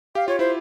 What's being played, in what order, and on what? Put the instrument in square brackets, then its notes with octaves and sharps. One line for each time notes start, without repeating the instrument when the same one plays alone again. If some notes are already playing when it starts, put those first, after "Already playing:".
[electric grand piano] G4 [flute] F5
[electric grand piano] F4 [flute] C#5
[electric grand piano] E4 [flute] C5